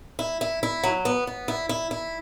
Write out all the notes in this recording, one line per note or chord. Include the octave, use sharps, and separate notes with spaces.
E4
E4
E4
F#3
B3
B3
E4
E4
E4